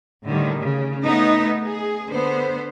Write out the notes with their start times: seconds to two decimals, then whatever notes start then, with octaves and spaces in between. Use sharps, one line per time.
0.24 A2 D3 D#3 G3
0.59 C#3
1.06 A3 B3 D#4
1.64 G#4
2.08 D3 B3 C5